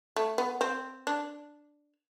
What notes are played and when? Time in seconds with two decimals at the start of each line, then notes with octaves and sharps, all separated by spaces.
0.16 A3
0.38 B3
0.61 C4
1.07 D4